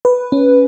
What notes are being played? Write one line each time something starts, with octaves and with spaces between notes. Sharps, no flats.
B4
C#4